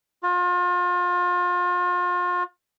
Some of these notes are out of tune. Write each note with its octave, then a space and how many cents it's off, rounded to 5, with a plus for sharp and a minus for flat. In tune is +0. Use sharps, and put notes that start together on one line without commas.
F4 +35